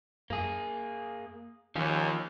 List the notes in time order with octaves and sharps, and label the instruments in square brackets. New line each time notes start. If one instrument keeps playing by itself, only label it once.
[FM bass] F#2 [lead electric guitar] A#3 G#4
[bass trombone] D#2 [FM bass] D#3 [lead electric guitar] F3 C#4